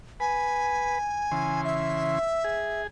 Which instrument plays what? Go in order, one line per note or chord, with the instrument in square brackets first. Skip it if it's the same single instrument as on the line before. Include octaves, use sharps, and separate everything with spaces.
[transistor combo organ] B4 [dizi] G#5
[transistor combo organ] C#3 E3 C6
[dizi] E5
[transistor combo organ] G#4